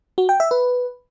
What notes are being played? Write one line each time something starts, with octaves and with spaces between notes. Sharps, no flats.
F#4
G5
E5
B4